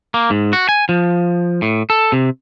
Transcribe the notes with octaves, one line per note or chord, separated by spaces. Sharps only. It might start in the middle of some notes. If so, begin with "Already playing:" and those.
A#3
G#2
F#4
G#5
F3
A2
A4
C3